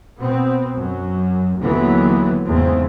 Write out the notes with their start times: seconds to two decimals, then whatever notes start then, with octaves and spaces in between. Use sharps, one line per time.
0.18 B2 B3 C4
0.78 F#2
1.61 D#2 D3 E3 F#3 B3
2.48 E2 G#2 C#3 C4